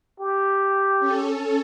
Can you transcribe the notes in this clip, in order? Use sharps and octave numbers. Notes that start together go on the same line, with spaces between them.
G4
C#4 A4